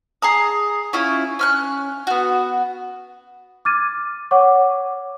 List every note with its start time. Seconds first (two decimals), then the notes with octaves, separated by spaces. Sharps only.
0.22 G#4 A#5 D#6
0.93 C#4 E4 F4
1.39 C#4 F6 F#6
2.07 B3 F#4
3.65 D6 F6 G#6 A6 D#7
4.31 C#5 F#5 C#6 D6